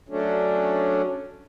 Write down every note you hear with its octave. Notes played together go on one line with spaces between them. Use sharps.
F#3 A3 C#4 D4